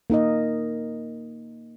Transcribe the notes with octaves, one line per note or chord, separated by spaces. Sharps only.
A#3 D#4 A#4 D#5